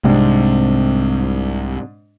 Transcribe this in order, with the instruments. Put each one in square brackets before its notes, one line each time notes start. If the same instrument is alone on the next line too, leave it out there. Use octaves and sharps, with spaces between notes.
[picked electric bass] C2 C3 [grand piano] G#2 C4 D4